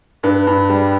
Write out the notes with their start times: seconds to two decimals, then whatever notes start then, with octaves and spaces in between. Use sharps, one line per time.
0.23 G2 B4
0.47 G2
0.69 G3